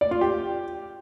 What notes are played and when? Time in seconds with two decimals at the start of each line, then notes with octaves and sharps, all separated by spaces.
0.01 D5
0.11 F4
0.21 G4